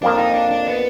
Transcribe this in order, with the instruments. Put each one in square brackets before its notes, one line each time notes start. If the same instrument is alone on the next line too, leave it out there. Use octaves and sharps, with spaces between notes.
[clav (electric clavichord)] F2 F3 A#3 [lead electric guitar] D4
[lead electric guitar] D#4
D4
D4
B3